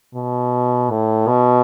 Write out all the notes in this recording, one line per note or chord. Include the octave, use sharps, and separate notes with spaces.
B2
A2
B2